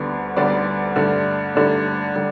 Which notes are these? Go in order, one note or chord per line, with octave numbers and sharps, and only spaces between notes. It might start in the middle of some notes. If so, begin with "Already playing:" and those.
Already playing: D2 D3 G3 B3
D2 D3 G3 B3 D5
G2 D3 A3
G2 D3 A3 D5
D3 G3